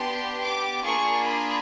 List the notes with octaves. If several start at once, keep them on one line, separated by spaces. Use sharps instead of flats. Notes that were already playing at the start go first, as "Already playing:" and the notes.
Already playing: B3 D4 G4 C6
D6
A#3 D4 F4 G#4 C#6
B5